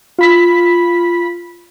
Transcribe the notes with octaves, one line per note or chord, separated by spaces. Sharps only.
F4 B5 B6